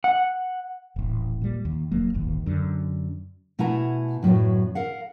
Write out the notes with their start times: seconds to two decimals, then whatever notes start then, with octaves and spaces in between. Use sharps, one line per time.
0.04 F#5
0.96 D#1 A1
1.41 A#2 G3
1.65 D#2
1.91 E1 F#3 A#3
2.14 D1 G1 D#2
2.46 F#2 D3
3.59 B2 A3 E4 F#5 G#5 A#5
4.23 F#2 A2 F#3 B3
4.75 A#4 F5 F#5